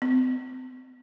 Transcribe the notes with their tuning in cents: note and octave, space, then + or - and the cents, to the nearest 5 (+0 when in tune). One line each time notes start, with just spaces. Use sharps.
C4 -40